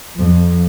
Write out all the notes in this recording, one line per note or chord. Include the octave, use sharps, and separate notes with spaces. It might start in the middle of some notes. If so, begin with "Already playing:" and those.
F2